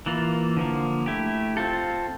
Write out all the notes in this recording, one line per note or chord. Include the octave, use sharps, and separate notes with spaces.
E3 A#3 F4
D3 F3 A#3
A3 E4 G4
C4 F4 A4